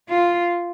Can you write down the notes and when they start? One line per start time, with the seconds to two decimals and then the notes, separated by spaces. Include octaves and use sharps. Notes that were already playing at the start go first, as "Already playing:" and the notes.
0.09 F4